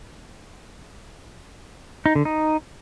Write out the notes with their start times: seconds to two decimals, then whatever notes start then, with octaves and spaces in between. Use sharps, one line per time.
2.06 D#4
2.15 D3
2.25 D#4